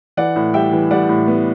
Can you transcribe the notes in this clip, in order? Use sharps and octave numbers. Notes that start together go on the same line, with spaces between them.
E3 D5 F#5
A2
G3 E5 G5
E3
G3 D5 F#5
A2
B3